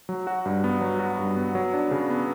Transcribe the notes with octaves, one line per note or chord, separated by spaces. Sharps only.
F#3
F#4
G2
B3
F#3
F#4
G2
B3
F#3
D4
C#3
B3